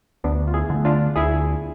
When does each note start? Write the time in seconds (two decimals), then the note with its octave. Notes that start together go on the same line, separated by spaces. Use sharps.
0.24 D2 B3 D4
0.48 F4
0.54 E4 G#4
0.70 D3 A3
0.85 D4 F4
1.16 D2 E4 G#4